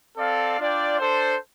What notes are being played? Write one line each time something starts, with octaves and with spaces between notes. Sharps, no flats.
C4 A4 D5 F5
D4 F4 D5 G5
D4 A4 C5